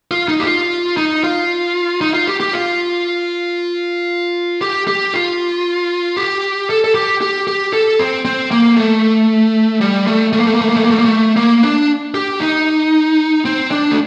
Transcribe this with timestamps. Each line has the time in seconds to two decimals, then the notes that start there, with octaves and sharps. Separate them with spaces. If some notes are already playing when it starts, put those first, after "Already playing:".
0.11 F4
0.28 D#4
0.40 G4
0.46 F4
0.97 D#4
1.24 F4
2.01 D#4
2.14 F4
2.27 G4
2.40 G4
2.53 F4
4.61 G4
4.87 G4
5.14 F4
6.17 G4
6.70 A4
6.84 A4
6.94 G4
7.21 G4
7.47 G4
7.73 A4
7.99 C4
8.25 C4
8.51 A#3
8.76 A3
9.81 G3
10.07 A3
10.33 A3
10.40 A#3
10.47 A3
10.54 A#3
10.61 A3
10.69 A#3
10.76 A3
10.84 A#3
10.90 A3
10.99 A#3
11.05 A3
11.36 A#3
11.63 D4
12.14 G4
12.40 D#4
13.45 C4
13.71 D4
13.91 A3